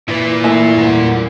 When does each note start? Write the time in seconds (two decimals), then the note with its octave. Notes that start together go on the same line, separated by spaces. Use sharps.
0.08 A#2 E4 B4
0.44 E3 A3 A#3
0.76 E2 A#4 F#5